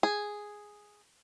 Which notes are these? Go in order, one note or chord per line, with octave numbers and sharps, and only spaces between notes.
G#4